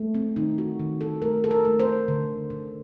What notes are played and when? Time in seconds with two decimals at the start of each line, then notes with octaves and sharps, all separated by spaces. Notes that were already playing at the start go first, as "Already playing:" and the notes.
Already playing: A3
0.15 C4
0.36 D#3 D#4
0.58 F#4
0.79 D#3
1.01 A4
1.22 A3 A#4
1.44 A4
1.51 A#4
1.65 A3
1.80 C5
2.08 D3
2.50 D3